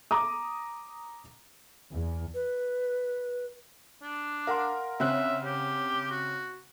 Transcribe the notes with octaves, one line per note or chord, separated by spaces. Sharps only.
A#5 D6 D#6
E2
B4
D4
A#4 F5 F#5 C6
C#3 C4 E5 F#6
G4
F#4